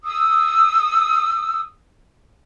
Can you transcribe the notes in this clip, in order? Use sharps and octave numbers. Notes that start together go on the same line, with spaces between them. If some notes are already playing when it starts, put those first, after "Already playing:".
D#6 E6